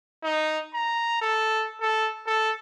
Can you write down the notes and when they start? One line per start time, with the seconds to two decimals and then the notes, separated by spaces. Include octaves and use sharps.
0.24 D#4
0.74 A#5
1.22 A4
1.81 A4
2.27 A4